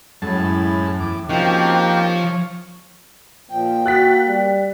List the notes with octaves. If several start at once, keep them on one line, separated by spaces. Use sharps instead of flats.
F#2 A2 G#3 A4 A5
E2 D6
F3 A#3 C4 C#4 D#4 F#4 G4 F5
C#5 F5
A#2 F3 G5
A#3 F#4 F#6 A6 B6
G3